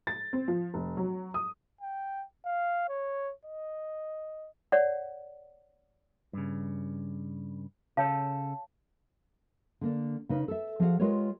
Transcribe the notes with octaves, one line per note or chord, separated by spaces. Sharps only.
A6
C4
F3
F1
F#3
D#6
G5
F5
C#5
D#5
C#5 D5 F#5
G2 C#3
C#3 A4 C#5 F5 A5
D3 A#3 D4
C#3 D#4 B4 F5
A4 E5
F3 F#4 G#4 C#5 F5 F#5
G#3 F4 G4 A#4 B4 C#5